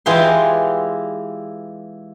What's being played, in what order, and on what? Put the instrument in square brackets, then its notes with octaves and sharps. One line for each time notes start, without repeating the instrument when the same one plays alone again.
[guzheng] E3 G#3 E4 F4 G4 C6